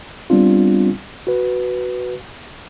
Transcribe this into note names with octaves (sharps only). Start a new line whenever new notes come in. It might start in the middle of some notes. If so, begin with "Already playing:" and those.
G3 B3 C4 D4 F4
F#4 B4